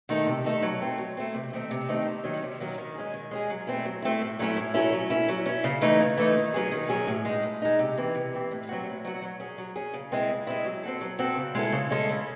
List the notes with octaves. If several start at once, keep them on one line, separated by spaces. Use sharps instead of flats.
D#3 A3 D#4 A4
C3
D#3 A3 D#4 A4
F#3
A3 C4
F#3
A3 C4
C3
D#3 A3 C4 D#4
C3
D#3 A3 C4 D#4
C3
D#3 F#3 C#4
C3
D#3 F#3 C#4
D#3
G#3 C#4 G#4
D#3
G#3 C#4 G#4
F#3
A3 C4 E4
F#3
A3 C4 E4
A2
F#3 A3 C#4 E4
A2
F#3 A3 C#4 E4
F#3
C#4 E4
F#3
C#4 E4
C#3
E3 A3 D#4
C#3
E3 A3 D#4
D#3
F#3 C#4 G#4
D#3
F#3 C#4 G#4
A2
G#3 D#4
A2
G#3 D#4
C3
E3 C4
C3
E3 C4
A2
F#3 C4 F#4
A2
F#3 C4 F#4
F#3
C#4 G#4
F#3
C#4 G#4
C#3
G#3 C4 E4
C#3
G#3 C4 E4
F#3
C4 F#4 A4
F#3
C4 F#4 A4
C#3
G#3 C#4 E4 A4
C#3
G#3 C#4 E4 A4
C#3